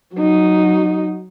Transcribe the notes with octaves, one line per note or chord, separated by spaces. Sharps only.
F#3 D#4